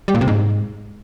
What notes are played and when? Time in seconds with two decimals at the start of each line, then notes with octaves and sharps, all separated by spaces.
0.08 G3
0.15 A#2
0.21 C3
0.28 G#2